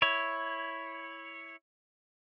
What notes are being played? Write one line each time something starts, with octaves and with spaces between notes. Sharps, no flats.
E4 C#5